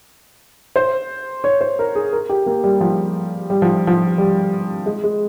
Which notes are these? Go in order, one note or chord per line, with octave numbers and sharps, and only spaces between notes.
C5
C#5
C5
A#4
G#4
A#4
G4
A#3
G3
F3
G3
F3
F3
G3
G#3
G#3